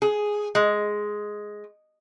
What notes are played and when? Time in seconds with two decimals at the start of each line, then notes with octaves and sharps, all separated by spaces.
0.02 G#4
0.55 G#3